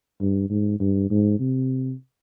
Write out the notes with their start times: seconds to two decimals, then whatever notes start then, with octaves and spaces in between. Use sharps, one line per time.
0.21 G2
0.50 G#2
0.80 G2
1.10 G#2
1.40 C3